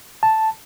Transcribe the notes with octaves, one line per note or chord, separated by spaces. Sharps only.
A5